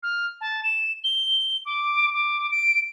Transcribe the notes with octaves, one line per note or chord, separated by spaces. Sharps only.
F6
A5
E7
G7
D6
D6
D7